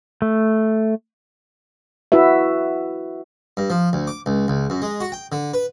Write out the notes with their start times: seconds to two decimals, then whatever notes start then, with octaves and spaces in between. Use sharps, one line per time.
0.22 A3
2.12 E4 F#4 B4 E5
3.57 G2
3.70 F3
3.93 D2
4.07 D6
4.26 C#2
4.48 C#2
4.70 F#2
4.82 G#3
5.00 F#4
5.12 G5
5.32 D3
5.54 B4